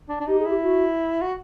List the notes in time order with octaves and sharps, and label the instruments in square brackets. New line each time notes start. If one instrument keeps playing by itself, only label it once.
[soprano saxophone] D4
D4
[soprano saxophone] D#4 [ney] G4
[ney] G#4
[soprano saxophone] E4 [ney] G4
[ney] F#4
[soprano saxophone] F#4